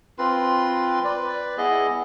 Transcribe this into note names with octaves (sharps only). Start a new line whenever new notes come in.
C4 F4 B4 C6
B4 D5
B3 E4 G#4 D#5